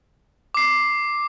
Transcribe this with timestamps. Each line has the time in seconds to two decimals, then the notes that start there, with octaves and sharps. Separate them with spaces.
0.54 D6 C7